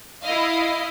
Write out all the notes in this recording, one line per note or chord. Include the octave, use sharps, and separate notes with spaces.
E4 D#5 F5